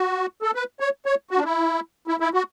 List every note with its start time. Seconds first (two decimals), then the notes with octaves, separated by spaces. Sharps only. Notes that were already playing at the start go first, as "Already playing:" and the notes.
Already playing: F#4
0.42 A4
0.55 B4
0.80 C#5
1.06 C#5
1.31 F#4
1.38 D4
1.44 E4
2.08 E4
2.20 E4
2.34 F#4